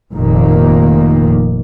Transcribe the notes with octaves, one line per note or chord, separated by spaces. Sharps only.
F1 A#2 D#3 A#3